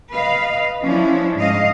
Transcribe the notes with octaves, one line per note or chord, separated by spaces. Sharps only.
B4 D#5 F5
F3 C#4 D4 E4
G#2 D#5 F5